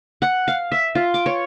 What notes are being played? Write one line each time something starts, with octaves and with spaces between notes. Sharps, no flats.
F#5
F5
E5
F4
D6
C#5